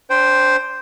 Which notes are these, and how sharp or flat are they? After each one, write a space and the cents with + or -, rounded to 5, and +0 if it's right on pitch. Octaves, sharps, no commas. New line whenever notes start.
D4 -35 C5 +0 G5 +0